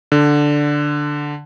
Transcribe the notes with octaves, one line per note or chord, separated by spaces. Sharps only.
D3